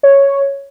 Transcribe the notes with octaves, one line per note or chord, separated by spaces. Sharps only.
C#5